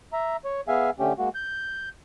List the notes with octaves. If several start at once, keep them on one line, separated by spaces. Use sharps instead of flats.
E5 A#5
C#5
B3 G#4 E5 F5 G#5
D3 A3 C#4 G4
G#3 A#3 F#4
G6